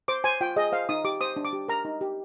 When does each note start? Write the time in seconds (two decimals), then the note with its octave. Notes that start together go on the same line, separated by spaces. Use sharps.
0.08 C5 D6
0.24 C5 G#5
0.41 F4 G5
0.56 G#4 D#5
0.72 C5 F5
0.89 D#4 D#6
1.04 G4 D6
1.21 C5 D#6
1.36 D4
1.45 D6
1.53 G4
1.68 A#4 A#5
1.85 D#4
2.01 G4